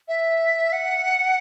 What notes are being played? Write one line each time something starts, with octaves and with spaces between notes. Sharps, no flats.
E5
F#5